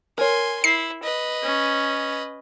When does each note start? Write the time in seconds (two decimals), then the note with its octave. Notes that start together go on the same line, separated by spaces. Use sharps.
0.18 A#4 C#5 G#5 C6
0.64 E4 C7
1.03 B4 D#5
1.43 C#4